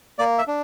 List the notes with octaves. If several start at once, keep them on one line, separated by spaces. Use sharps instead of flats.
A#3 D5
E5
D4